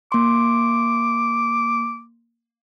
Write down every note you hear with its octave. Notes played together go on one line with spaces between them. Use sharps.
A#3 C6 D6